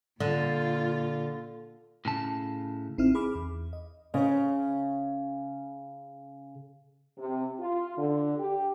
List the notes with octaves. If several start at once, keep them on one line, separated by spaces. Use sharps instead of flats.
A#2 D3 F4
A2 C#3 A5
A1 C4 D#4 E4 F6
G#4 B5 D6 F6
E2
D#5
C#3 C5 D#5
C3
F4
D3
G4